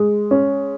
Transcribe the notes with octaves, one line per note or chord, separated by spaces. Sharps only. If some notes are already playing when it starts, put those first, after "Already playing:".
Already playing: G#3
C#4